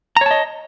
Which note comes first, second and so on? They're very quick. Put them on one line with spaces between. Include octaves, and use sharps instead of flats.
A#5 C#5 A5 D#5